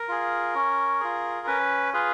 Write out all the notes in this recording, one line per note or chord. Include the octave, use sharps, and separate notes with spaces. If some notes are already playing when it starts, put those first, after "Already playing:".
Already playing: A#4
F4 G#4
C#4
F4 G#4
C#4 B4
F4 G#4 B4